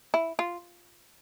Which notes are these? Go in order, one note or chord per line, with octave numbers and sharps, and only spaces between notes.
E4
F4